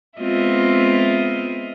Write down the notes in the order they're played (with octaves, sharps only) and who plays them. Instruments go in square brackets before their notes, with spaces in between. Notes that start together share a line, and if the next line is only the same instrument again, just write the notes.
[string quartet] G#3 B3 C4 F4 D#5 E5